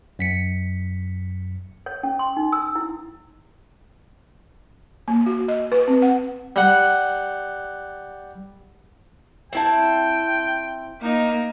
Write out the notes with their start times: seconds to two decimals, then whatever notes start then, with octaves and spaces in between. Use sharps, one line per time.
0.19 F#2 B6 C#7
1.86 C#5
2.03 C#4
2.19 C6
2.37 D#4
2.52 E6
2.75 E4
5.08 A#3
5.26 F#4
5.48 D#5
5.72 B4
5.88 C4
6.02 F#5
6.56 G3 F#5
9.53 C4 E4 G5 A5
11.01 A#3 D#4